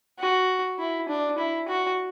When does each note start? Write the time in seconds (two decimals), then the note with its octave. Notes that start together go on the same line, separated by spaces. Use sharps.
0.19 F#4
0.79 E4
1.09 D4
1.38 E4
1.68 F#4